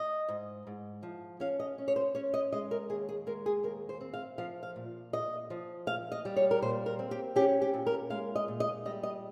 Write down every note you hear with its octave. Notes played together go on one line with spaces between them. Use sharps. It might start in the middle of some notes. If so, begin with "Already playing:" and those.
Already playing: D#5
G#2
G#2
F3
C#4 F5
D#5
C#4
C#5
C5
C#4 C#5
D#5
G#3 D#5
A#4
D#2 G#4
G#4
G#3 A#4
G#4
D#2 A#4
C5
C4
F5
F3 F5
F5
A#2
A#2 D#5
F3
A#2 F5
D#5
G3
C#5
A#4
A#2 C5
A#4
C4
G4
C#4 G4
G4
A#2
A#4
G#3 F5
D#5
A#2
D#5
G3 D#5
D#5